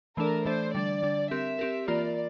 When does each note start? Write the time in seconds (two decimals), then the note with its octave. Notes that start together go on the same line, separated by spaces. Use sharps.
0.17 E3 A3 D4 A4 A#4 D5
0.45 E3 A3 D4 A4 C5 D5
0.74 D3 G3 D4 D5
1.03 D3 G3 D4
1.31 C4 G4 A#4 E5
1.59 C4 G4 A#4
1.88 E3 A#3 F4 A#4 D5